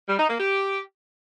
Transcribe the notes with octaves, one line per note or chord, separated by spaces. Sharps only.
G3
D#4
A#3
G4